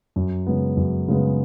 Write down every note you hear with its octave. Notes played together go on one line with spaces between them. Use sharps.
F#2
C#3 G#3 B3
F#2
C#3 G#3 B3